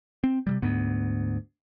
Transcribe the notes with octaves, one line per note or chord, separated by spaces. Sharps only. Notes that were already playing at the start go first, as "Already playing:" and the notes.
C4
C3 D#3 G3
D2 G#2 B3